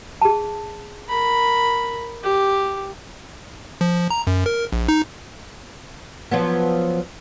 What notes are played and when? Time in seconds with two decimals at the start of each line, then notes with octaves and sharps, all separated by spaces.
0.22 G#4 A5
1.08 A#4 B5
2.24 G4
3.81 F3
4.11 A#5
4.27 F#2
4.46 A#4
4.73 A#1
4.88 D#4
6.31 F3 F#3 B3